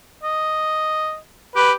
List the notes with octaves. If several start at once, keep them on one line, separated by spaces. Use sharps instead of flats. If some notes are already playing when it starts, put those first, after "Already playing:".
D#5
G4 B4